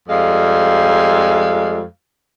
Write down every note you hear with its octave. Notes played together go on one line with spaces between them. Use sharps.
F2 G3 G#3 F5